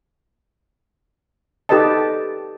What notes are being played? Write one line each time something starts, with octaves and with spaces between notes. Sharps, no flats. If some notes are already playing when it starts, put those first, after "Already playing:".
D#4 G4 A4 B4 D#5 A5